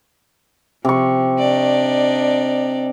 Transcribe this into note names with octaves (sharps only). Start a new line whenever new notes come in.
C3 F3 C#6
D4 D#4 D5